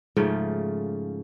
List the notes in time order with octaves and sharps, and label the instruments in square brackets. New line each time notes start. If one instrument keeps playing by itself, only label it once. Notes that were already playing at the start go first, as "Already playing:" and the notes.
[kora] G#2 C#3 F3 A3